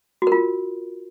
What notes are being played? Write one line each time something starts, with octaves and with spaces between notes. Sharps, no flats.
F4 F#4 A#4